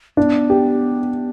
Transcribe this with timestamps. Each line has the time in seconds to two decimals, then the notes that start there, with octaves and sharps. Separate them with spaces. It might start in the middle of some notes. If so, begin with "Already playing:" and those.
0.17 B3 D4
0.50 G4